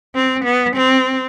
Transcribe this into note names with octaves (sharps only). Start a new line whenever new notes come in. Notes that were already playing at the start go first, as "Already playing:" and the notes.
C4
B3
C4